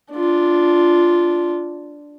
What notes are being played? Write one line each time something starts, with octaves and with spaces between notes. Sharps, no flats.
D4 F4